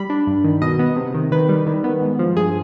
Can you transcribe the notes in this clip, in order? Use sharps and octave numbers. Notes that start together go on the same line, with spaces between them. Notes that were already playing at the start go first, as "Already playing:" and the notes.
Already playing: G3 B5
D4
G2
D#3
B2 D#5
B3
C3
D#3
D#3 B4
G3
D#3
B3
G#2
F3
G2 G#4